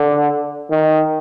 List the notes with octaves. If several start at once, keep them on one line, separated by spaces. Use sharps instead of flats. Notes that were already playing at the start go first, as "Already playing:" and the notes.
Already playing: D3
D#3